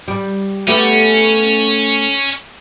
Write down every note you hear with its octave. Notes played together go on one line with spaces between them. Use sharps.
G3
A3 B3 C#4 G4